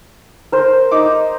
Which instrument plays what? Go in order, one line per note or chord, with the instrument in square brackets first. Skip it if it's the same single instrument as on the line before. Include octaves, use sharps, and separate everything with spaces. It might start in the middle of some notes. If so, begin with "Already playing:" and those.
[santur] A#4 C5
[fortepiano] D#4 D6